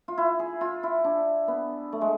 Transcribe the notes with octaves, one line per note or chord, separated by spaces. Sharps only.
F4
E4
G#4
F4
E4
D4
B3
A3
G#3